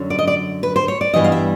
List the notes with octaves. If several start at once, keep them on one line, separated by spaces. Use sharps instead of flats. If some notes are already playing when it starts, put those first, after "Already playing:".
Already playing: F#2 D3 F#3
D5
D#5
D5
B4
C5
C#5
D5
G2 E3 G3 B3 D#5
F5
E5